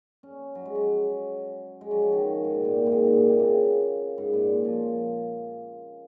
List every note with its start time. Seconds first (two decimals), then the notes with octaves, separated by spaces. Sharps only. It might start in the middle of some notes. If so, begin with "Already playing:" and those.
0.23 C#4
0.55 F#3
0.65 G#3
0.75 F#3
1.81 G#3
1.91 F#3
2.02 F3
2.12 D#3
2.44 G#2
2.54 A#2
2.65 A#2
2.76 C3
2.86 G#2
2.92 A#2
3.07 G#2
3.17 A#2
3.29 C3
3.39 C#3
4.18 G#2
4.33 A#2
4.65 F3